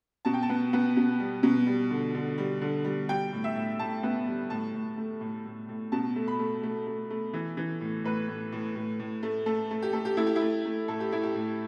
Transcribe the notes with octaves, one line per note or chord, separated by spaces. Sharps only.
B2 A5
G5
A5
B3
B3
B2
G3
B2
G3
D3
D3
G3
D3
G3
G3 G5
A2
E5
A2
A2 A5
B3
G3
A2 A5
A2
A3
A2
A2
A2
B2 A5
A3
B5
A3
A3
A3
A3
E3
E3
A2
A2 B4
A2
A2
A2
A2
A3
A3 A4
A3
G4
A3 A4
G4
A3 E4
G4
E4
A3
A3
A2 A4
G4
A3 E4
G4
A2